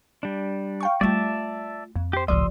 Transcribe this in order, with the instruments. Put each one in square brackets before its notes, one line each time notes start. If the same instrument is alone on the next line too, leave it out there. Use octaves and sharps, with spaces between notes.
[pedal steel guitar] G3 D4
[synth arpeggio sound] F5 G5 C#6
[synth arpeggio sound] G3 [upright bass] A3 F4 [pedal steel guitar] D5 E5 A5
[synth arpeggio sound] F2 [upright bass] C4
[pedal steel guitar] G4 C5
[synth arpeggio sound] G1 F3 D5 [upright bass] C#2 A2 [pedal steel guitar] C6 D#6 E6